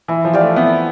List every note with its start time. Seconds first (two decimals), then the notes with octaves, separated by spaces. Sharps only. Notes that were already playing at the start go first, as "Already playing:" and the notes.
0.08 E3 E4
0.25 F3
0.33 G4 D5 F5
0.41 A3
0.56 B3 E4